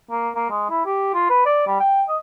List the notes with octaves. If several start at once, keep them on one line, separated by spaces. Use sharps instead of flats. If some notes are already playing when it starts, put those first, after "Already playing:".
A#3
A#3
G#3
E4
G4
F4
B4
D5
G3
G5
D#5